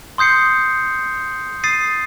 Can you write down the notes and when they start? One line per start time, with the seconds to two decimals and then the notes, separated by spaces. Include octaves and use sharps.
0.18 C6 D#6 G6 C7 C#7
1.64 D#6 A6 C7 D#7